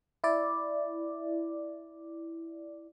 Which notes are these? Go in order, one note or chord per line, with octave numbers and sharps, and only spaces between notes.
E4 D5